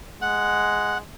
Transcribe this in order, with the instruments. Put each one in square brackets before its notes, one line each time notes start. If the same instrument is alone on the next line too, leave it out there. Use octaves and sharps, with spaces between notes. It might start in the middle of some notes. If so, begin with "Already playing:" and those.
[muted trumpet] G#3 [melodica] F#5